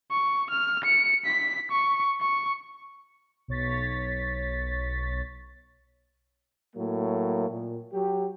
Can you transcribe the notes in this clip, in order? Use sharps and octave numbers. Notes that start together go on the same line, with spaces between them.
C#6
F6
C#7
B6
C#6
C#6
B1 C#5 A6 B6
A2 F#3 A#3
A#2
F#3 G4